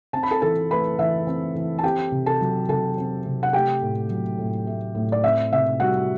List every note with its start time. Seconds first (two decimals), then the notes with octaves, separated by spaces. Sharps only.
0.13 C4 A5
0.23 B5
0.31 A4 A5
0.42 E3 A4 A5
0.71 A3 B4 B5
0.99 E3 E5
1.27 C4
1.56 E3
1.79 A5
1.83 C4 G4 G5
2.12 C3
2.26 A4 A5
2.41 F#3
2.69 C3 A4 A5
2.98 C4
3.25 C3
3.43 F#5
3.53 A3 G4 G5
3.82 A2
4.10 F#3
4.38 A2
4.67 A3
4.95 A2
5.12 D5
5.23 C4 E5
5.53 C3 E5
5.80 G3 F#4 F#5